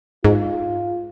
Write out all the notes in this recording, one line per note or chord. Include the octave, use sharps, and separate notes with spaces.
G#2 F4